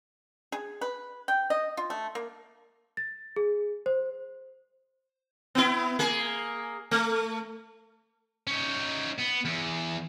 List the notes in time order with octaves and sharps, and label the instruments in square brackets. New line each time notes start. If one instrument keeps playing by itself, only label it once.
[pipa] G#4
B4
G5
D#5
F4
A3
A#3
[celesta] A6
G#4
C5
[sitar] B3 E4
A#3 G#4
A3
[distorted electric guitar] C#4 D#4
B3
E2